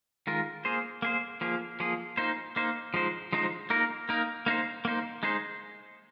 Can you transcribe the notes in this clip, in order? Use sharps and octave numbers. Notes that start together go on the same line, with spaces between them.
D#3 G#3 F4 A#4
A#3 G#4 C5
A#3 G#4 C5
F3 A#3 G#4
F3 A#3 G#4
A#3 D#4 C5
A#3 D#4 C5
F3 G#3 D#4 C5
F3 G#3 D#4 C5
A#3 D#4 A#4
A#3 D#4 A#4
A#3 D#4 C5
A#3 D#4 C5
G#3 D#4 G#4 C5